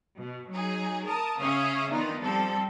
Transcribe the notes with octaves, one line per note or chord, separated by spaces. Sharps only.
B2
F#3 D#4 G#4
A#4 A5 D#6
C#3 C#4 E5 F5 D#6
D#3 E3 B3 D4 D#4 F4
F3 G3 C4 A4